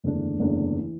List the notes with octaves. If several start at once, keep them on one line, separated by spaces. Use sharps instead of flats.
F#1 E2 D3 A3 D4
F#1 E2 D3 A3 D4
E3